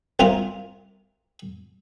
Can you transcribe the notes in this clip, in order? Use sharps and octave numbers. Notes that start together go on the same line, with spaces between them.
C2 C3 F4 A#4